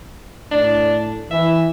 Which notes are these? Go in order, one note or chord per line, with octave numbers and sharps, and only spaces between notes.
A2 D4
E3 E5